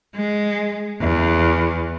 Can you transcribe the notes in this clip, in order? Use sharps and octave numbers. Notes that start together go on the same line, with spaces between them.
G#3
E2